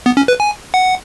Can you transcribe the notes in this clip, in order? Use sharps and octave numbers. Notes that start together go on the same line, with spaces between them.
B3
C#4
B4
G#5
F#5